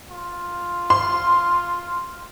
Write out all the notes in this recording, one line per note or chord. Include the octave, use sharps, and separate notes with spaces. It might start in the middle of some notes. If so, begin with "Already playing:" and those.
F4
C6